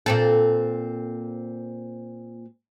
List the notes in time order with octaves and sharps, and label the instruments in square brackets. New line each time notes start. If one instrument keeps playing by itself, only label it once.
[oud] A#2 C4 A4